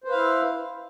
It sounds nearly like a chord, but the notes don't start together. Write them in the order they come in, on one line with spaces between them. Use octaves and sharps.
C5 B4 F5 E4